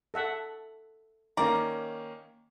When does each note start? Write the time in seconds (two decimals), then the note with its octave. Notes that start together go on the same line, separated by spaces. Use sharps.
0.14 A4 E5 F#5
1.37 D#3 A#3 C#4 D5 A#5